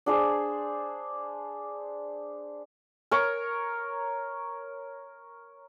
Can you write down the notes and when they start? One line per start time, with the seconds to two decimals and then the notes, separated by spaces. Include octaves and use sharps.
0.06 D4 G#4 C5
3.11 A#4 C#5 A#5